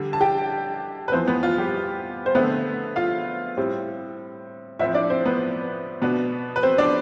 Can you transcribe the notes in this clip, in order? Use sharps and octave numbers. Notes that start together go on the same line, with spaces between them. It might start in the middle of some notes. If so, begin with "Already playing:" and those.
Already playing: D3 G3 D4
A5
G4 G5
B4
F2 E3 B3 C4 C5
B3 B4
F4
G3 G4
C5
D3 A3 B3 C4 B4
F4 F5
A2 G3 C4
A2 F3 C4 E4 E5
D4 D5
C4 C5
B3 B4
B2 B3 D4 B4
B4
C4 C5
D4 D5